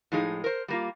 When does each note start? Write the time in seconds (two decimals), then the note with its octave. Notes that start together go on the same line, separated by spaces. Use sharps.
0.12 A2 F3 G#3 D#4 G#4
0.44 A#4 C5
0.68 G3 A#3 F4